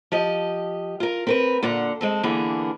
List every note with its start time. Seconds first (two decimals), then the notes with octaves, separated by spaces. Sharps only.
0.12 F3 G4 D#5
1.00 F4 A#4
1.27 C4 A#4 B4
1.63 A#2 D3 F#5
2.01 G#3 C4 A4
2.23 D3 E3 A#3 B3 G#4